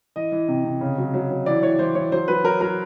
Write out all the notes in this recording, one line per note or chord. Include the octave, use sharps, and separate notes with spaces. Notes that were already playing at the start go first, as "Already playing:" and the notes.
E3 D#5
E3
C3
C3
C#3
F#3
F#3
F#3
E3 D5
E3 C#5
E3 C5
E3 C#5
F#3 C5
F#3 B4
F#3 A#4
F#3 A#4